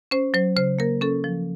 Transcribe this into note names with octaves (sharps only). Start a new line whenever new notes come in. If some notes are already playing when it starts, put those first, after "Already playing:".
C#4 C5
F#3 C5
C#3 C5
A#3 A#4
C#4 A4
F3